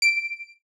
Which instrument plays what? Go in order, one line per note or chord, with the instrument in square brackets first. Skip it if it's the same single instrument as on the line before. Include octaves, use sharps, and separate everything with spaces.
[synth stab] D7